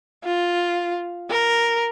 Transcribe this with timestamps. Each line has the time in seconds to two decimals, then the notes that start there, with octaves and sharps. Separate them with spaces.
0.24 F4
1.30 A#4